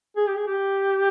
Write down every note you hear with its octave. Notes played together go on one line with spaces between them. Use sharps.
G#4
G4
G#4
G4